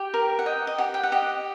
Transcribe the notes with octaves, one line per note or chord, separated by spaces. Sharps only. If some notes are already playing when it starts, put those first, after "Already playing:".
Already playing: G4 G5
A#4
F#5
D#5 G5
D#5
G4 F#5
G5
F#5
G4 D#5